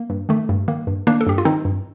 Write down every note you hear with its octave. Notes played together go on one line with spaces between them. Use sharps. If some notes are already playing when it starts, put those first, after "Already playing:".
Already playing: A#3
G2
D#3 A3
G2
D#3 A#3
G2
D#3 A#3 D4
A4
G2 G4
F4
D#3 C4 D#4
G2